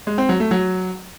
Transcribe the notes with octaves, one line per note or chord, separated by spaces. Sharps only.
G#3
C4
F#3
A3
F#3